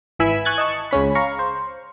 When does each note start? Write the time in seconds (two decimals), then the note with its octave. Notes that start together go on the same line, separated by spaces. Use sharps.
0.19 G#1 E3 E5 G#5 B5 E6
0.45 G#5 C#6 F#6 G#6 A6
0.58 D#5 A5 C#6
0.91 C#2 C#3 C#4 B5
1.15 F5 A#5 C#6
1.39 C5